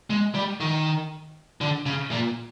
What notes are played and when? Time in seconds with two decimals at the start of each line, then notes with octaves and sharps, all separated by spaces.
0.10 G#3
0.35 G3
0.61 D#3
1.61 D3
1.86 C#3
2.11 A#2